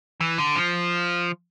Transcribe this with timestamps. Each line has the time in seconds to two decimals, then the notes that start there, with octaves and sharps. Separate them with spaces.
0.21 E3
0.38 D3
0.56 F3